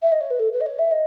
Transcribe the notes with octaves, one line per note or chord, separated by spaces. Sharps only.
E5
D#5
C#5
B4
A4
B4
D#5
C#5
E5
D#5